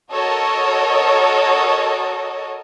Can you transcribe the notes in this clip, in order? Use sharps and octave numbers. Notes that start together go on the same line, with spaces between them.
F#4 A4 A#4 C#5 D#5